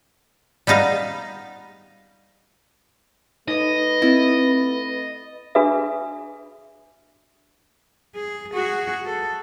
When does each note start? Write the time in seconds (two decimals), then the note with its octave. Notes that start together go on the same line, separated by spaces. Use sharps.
0.67 G3 B3 D#4 F5
3.48 A3 D#4 B4 D#5
4.02 C4 E4 A6
5.55 D4 F#4 G#4 A4 B4 E5
8.15 G#4
8.54 F#4 G#4
9.06 A4